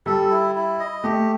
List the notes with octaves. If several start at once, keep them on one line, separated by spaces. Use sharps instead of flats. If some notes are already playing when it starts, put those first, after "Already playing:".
G3 A4
E4
E4
D#5
A3 G4